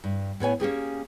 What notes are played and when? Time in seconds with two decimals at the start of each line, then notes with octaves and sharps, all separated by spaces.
0.04 G2
0.40 A2 B3 C#5 G#5
0.60 A#3 C#4 G4 G#4